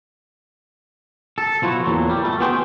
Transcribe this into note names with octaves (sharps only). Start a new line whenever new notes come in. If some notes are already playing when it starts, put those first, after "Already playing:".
A4
B1 F3 E4 F#4
E2 A#2 F#3
G3
A3
B3 F#4 G#4 C5 G5